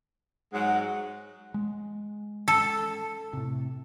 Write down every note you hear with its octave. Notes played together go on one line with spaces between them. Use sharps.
G#2 F#3 G#3 F#5
G#3
A4
A2 C3